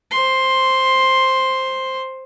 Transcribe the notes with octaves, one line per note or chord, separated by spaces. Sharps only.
C5 C6